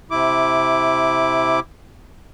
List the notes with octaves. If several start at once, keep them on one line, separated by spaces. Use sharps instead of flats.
C3 E4 D6